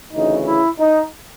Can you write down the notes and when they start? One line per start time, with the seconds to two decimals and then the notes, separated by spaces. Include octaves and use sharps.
0.12 D2 C#3 E3 D#4
0.46 E4
0.79 D#4